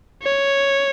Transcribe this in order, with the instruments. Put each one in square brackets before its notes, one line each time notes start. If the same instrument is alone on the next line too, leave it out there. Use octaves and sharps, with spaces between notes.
[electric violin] C#5